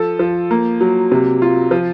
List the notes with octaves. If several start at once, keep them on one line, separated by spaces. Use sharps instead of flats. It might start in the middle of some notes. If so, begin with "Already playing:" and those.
Already playing: F3 A4
F3
A#3
F#3
C3
F4
F3